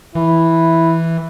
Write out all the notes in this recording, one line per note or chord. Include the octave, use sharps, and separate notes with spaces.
E3 E4